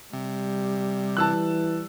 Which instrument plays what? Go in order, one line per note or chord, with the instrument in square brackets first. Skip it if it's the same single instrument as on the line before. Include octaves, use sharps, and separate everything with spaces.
[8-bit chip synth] C3 [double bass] G3
[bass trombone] E3 [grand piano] A5 E6 F#6